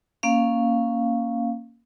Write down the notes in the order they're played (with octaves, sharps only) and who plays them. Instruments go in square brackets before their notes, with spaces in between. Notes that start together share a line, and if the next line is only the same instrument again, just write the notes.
[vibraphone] A#3 C#4 F5